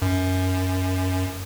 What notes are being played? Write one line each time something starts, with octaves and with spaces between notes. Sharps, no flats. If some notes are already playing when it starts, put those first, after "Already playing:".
F#2